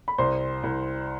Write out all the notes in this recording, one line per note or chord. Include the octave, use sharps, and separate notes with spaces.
B5
C2 C5 C6
C2